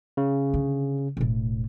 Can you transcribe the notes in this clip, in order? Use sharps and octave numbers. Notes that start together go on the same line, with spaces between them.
C#3
D3
E1 A2